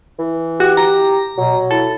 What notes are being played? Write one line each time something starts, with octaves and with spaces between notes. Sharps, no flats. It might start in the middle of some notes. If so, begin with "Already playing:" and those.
E3
F#4 G4
A#5
B2 F#3
E4 A4